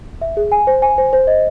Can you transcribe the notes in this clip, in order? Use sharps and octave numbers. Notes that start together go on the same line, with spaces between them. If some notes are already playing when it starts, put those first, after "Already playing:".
E5
G#4
G#5
C5
G#5
C5
C5
D#5